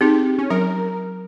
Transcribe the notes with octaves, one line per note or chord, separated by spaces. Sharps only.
C4 D#4 G4 G#4
C#4
F#3 A#4